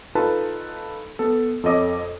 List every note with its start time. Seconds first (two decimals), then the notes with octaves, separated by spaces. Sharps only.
0.15 D#4 F4 A4 B4 A5
1.19 B3 A4
1.63 F2 A4 C#5 D#5 D6 D#6